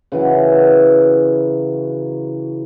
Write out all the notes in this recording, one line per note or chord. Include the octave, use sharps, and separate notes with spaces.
C#3 E3 F#3